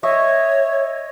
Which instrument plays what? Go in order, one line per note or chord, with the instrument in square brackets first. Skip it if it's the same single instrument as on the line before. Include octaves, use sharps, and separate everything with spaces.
[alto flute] C#5 [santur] D#5 E5 C#6